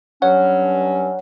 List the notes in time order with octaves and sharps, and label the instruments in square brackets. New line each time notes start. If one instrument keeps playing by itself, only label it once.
[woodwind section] G2 F#3 C#4 [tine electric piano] C#5 F#5